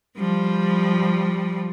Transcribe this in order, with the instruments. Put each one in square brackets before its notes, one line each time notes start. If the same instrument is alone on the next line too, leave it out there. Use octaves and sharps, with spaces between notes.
[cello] F3 G3